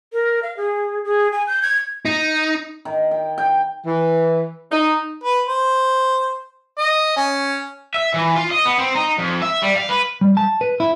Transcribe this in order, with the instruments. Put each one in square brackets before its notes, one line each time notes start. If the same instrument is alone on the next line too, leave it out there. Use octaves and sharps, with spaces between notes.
[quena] A#4
F5
G#4
G#4
G#5
G6
G#6
[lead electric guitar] D#4
[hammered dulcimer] D#3
G5
G5
[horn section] E3
D#4
[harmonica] B4
C5
D#5
C#4
[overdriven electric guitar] E5
E3
F4
D#5
B3
C4
D#4
F2
E5
G3
F5
B4
[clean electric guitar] G3
A5
B4
E4